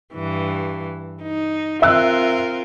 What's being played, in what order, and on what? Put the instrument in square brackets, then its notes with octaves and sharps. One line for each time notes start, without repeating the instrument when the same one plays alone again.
[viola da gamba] G2 E3
D#4
[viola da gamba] C4 F4 A#4 [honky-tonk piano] E5 E6 F#6